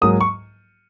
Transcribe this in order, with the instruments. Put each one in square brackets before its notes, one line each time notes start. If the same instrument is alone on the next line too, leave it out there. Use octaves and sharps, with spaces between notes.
[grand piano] G#2 F#3 A#3 D#6
C#6